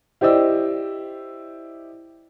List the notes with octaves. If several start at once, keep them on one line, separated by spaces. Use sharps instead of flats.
E4 G4 C5 D5 D#5 E6